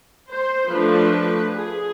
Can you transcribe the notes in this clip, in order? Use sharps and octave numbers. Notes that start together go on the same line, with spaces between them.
C5
F3 A3 D4 B4
G#4